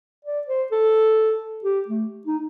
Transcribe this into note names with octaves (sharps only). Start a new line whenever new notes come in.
D5
C5
A4
G4
A3
D#4